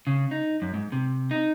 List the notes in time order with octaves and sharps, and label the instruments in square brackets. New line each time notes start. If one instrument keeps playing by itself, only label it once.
[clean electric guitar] C#3
D#4
F#2
G#2
C3
D#4